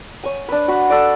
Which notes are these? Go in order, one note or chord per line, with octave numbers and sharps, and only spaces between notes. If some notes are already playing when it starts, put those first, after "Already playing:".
C#5 G#5
D4 B4
F#4 F#5 B5
A4 D5